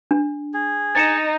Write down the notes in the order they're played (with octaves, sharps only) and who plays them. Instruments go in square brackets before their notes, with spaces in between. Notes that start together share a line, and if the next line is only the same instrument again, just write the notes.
[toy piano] D4
[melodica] G#4
[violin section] D#4 [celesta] A6 C#7 E7